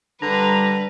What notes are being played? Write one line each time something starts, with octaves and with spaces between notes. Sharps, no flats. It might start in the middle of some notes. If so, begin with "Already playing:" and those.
D3 G3 B4 A#5